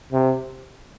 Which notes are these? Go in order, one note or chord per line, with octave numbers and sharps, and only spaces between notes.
C3